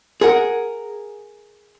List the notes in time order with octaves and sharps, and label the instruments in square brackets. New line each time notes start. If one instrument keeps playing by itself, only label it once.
[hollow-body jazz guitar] G#4 A#4 F#5